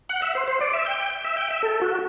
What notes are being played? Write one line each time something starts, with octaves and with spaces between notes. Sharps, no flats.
F#5
E5
C5
C5
D5
E5
G5
G5
E5
G5
E5
A4
F#4